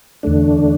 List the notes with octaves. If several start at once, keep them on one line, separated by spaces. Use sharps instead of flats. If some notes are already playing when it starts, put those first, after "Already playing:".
E2 D3 A3 D4